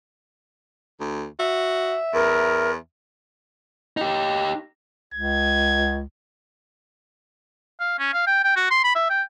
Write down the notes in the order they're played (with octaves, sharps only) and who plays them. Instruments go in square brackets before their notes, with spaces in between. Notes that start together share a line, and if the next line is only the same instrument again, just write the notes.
[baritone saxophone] D2
[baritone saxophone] F#4 [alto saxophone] E5
[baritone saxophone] E2 [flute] A#4
[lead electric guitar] D#4 G4
[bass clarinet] C#2 [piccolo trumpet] G#6
[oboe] F5
C#4
F5
G5
G5
F#4
C6
B5
E5
G5